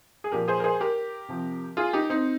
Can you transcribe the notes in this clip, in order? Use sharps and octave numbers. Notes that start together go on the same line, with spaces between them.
G#4
A#2 F3 G4 A#4
G#4 C5
A#4
G#4 C5
G4 A#4
C3 F3
F4 G#4
D#4 G4
C4 D#4